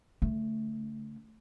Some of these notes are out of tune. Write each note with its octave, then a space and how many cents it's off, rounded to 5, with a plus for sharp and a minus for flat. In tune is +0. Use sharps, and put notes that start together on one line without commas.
D3 -40 A3 +0